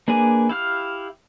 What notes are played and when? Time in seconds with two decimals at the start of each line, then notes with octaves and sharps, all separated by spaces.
0.08 A#3 D4 G#4 B4 G#5
0.49 E4 G4 F5 F6